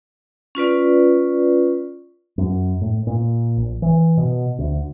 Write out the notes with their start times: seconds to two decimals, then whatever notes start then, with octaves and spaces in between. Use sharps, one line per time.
0.55 C#4 F4 B4 D5
2.38 F#2
2.81 A2
3.07 A#2
3.57 A#1
3.82 E3
4.17 B2
4.59 D2